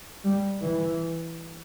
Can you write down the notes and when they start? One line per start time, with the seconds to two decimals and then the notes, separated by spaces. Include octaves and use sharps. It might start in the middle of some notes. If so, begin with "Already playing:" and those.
0.24 G3
0.62 E3